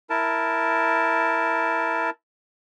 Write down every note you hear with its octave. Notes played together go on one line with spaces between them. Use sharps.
E4 A#4 A5